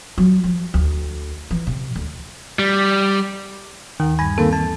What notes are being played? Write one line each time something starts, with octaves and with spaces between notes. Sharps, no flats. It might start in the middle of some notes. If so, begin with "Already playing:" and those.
F#3
F3
D2
E3
C3
D2
G3
D#2 D#3 F#5
G2 G3 G#5
D#3 A#3 C4 A4
E3 A5